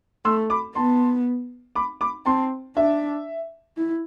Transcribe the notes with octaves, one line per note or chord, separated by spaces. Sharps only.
A3 C6 E6
B5 D6
B3 A5 C6
B5 D6
B5 D6
C4 A5 C6
D4 E5
E4